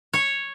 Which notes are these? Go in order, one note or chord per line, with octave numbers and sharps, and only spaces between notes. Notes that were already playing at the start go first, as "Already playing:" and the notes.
C#5